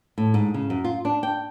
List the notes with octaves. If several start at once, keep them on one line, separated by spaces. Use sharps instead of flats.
A2
G#2
C#3
F#2
F4
D4
G5